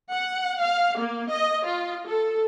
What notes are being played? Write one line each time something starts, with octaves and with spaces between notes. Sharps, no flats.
F#5
F5
A#3
D#5
F4
A4